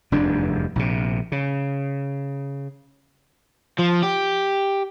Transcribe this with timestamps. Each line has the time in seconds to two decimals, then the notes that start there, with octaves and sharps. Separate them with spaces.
0.12 F1 E2 G2 D4
0.76 A#1 C3
1.32 C#3
3.78 F3
4.03 G4